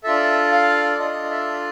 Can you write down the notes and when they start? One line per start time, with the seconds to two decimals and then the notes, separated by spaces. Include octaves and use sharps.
0.04 D4 F4 A4 E5
0.52 F5
0.99 D4 F4 A4 D#5
1.24 D#5
1.31 E5